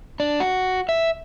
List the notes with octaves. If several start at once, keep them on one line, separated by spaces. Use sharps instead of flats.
D4
F#4
E5